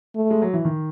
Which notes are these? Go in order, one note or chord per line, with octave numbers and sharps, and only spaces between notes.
A3
G#3
F#3
E3
D#3